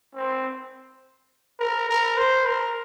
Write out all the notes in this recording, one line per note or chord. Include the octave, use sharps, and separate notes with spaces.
C4
A#4
A#4
C5
A#4